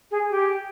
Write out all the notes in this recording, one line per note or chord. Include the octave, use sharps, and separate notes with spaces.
G#4
G4